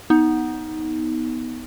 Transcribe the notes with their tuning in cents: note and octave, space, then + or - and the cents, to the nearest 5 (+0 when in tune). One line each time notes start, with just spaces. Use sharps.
B3 +0 D#4 +15